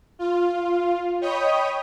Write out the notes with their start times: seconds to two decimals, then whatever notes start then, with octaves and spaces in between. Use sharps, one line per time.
0.19 F4
1.21 C#5 D#5 G5 B5 D#6